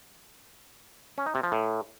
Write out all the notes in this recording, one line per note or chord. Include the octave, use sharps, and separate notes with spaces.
C#4
D#4
C3
F3
A2